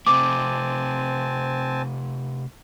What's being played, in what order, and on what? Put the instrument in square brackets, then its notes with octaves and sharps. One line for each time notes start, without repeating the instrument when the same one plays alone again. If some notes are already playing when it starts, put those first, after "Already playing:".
[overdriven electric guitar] C3 A3 [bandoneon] C4 G#5 A5 [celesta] D6